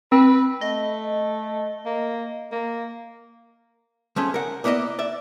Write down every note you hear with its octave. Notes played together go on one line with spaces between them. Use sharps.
C4 B4
A3 D#5
A#3
A#3
F3 A3 C#4 G#4
A#4 F#5
A#3 B3 E4 D5 D#5
D5 E5